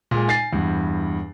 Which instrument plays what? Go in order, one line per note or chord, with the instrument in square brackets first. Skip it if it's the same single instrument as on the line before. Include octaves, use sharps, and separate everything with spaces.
[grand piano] A#2 G#3
G#5 A6 C7
E2 G2